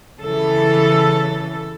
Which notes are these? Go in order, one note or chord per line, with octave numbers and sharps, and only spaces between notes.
C#3 E3 A4